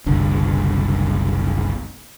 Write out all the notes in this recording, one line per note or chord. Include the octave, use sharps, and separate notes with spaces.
F#1 C2 D3